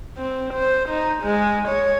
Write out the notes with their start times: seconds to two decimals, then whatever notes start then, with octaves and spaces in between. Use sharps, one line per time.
0.18 C4
0.54 C5
0.89 D#4
1.23 G#3
1.68 C#5